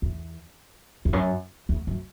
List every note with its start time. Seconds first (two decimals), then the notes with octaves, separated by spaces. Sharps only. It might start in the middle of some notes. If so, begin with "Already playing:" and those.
0.02 E2
1.05 E2
1.13 F#2
1.69 E2
1.87 F#2